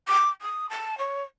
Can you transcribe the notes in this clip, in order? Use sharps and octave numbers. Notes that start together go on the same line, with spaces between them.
D6
D#6
A5
C#5